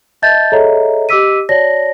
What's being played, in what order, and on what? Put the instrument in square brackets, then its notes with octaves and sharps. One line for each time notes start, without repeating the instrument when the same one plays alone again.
[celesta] D#5 E5 A5 G6 A6
G#4 A4 C#5 D#5 E5 A#5
G4 D#5 D6 E6 B6 D#7
F#4 C#5 D5 A5 A#6